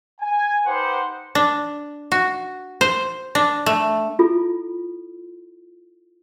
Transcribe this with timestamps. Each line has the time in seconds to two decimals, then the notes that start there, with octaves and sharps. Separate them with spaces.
0.20 G#5
0.66 D#4 G4 B4 C5 F#5 C6
1.35 D4
2.12 F#4
2.81 C5
3.35 D4
3.66 A3
4.19 E4 F4 A4